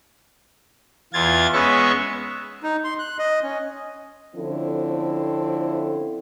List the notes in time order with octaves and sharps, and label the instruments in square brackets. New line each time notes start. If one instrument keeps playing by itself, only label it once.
[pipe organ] E2 F4 G#6 A6
G#3 B3 C#4 E5 C#6
[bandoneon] D#4
C6
F#6
D#5
C#4
[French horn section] D3 F3 C4 C#4 E4 A4